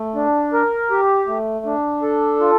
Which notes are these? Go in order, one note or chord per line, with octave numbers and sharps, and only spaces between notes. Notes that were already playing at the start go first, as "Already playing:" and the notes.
Already playing: A3
D4
A#4
G4
A3
D4
A4
F4